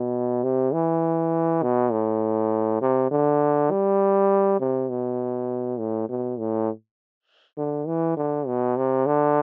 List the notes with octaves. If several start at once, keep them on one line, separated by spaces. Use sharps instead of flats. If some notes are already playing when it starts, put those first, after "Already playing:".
Already playing: B2
C3
E3
B2
A2
C3
D3
G3
C3
B2
A2
B2
A2
D3
E3
D3
B2
C3
D3